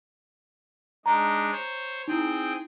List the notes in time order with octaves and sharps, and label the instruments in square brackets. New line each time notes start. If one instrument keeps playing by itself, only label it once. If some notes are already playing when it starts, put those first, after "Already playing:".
[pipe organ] G#3 D4 D#4 [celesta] A#5
[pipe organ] C5 C#5
[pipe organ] C4 G#4 G5 [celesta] D#4 E4